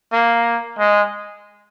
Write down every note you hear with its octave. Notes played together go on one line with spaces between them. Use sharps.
A#3
G#3